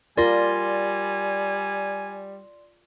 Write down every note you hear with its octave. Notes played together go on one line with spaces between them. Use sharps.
G3 F4 A#4 D5 G#5 C6 A#6